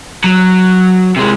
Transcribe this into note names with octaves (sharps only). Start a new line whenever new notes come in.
F#3
C3 G#3